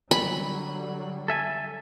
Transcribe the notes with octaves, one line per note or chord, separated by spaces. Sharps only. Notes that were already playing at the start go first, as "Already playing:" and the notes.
D3 F#3 G3 B5
A4 E5 G#5